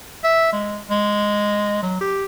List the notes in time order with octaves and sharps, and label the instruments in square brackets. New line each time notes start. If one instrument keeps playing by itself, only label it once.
[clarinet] E5
G#3
G#3
F#3
G4